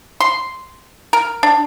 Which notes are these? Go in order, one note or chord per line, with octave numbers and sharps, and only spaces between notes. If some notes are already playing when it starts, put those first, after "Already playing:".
C6
A#4
D4